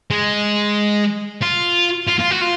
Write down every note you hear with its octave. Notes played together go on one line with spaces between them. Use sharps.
G#3
F4
F4
F4
F#4
F4